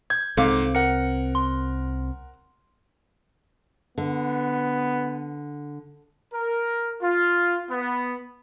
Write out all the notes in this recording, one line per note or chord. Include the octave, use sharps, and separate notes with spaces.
G6 G#6
C2 G#2 C4 A4 F5 D6
A#4 F#5 C#7
C6
D3 B3
A#4
F4
B3